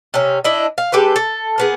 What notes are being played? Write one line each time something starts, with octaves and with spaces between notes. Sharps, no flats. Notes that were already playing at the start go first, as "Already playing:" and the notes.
C3 C#4
D4 E4 D#5
F5
G#3 G4 A4 B4
A4
A#3 B3 G#4